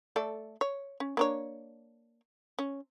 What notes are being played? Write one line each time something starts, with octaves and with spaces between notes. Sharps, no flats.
A3 A4 D5
C#5
C#4
A#3 D4 C#5
C#4